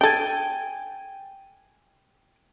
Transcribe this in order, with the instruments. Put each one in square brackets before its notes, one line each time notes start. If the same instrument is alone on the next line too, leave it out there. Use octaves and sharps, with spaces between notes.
[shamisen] D4 A4 [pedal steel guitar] G5 G#5